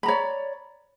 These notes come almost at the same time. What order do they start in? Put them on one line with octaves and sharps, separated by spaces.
B5 A#5 C#5 D5